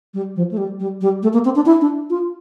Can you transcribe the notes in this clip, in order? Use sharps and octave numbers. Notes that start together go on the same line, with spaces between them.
G3
F3
A3
G3
G3
G3
A3
A#3
C4
D4
E4
D4
F4